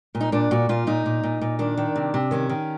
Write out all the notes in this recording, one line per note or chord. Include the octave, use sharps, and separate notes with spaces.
A#2
D#4
A#2 D4
A#2 F#4
A#2 F4
A#2 D#4
A#2
A#2
A#2
D#3 D4
D#3
C3
C3
D#3 C#4
D#3